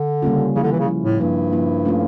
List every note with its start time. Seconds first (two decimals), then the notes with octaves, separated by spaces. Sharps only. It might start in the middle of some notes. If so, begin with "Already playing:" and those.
Already playing: D3
0.22 C#3 G3 A#3 C#4 F4
0.56 C#3 F3 A#3 E4
0.63 D3
0.72 E3
0.80 C#3
0.88 F3 A#3 E4
1.04 A2
1.20 G2 F3 A#3 E4
1.52 F3 A#3 E4
1.85 A3 C#4 F4